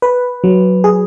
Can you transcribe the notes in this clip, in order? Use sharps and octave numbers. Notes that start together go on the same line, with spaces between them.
B4
F#3
G#4